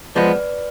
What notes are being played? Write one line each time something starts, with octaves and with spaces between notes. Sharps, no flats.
F3 G#3 B3 B4 D5